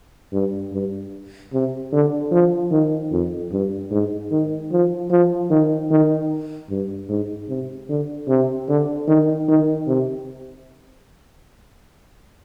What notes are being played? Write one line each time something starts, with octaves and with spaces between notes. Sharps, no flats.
G2
G2
C3
D3
F3
D#3
F2
G2
G#2
D#3
F3
F3
D#3
D#3
G2
G#2
C3
D3
C3
D3
D#3
D#3
C3